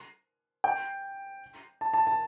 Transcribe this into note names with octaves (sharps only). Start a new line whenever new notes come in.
G5
A5
A5
A5